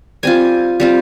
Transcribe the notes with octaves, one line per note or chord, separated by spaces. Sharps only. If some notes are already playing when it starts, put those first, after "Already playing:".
G3 C4 F4 G#5
G3 C4 F4